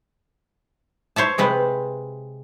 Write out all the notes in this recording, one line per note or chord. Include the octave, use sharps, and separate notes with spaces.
C5 C#5 E5 A5
C3 G#3 C4 B4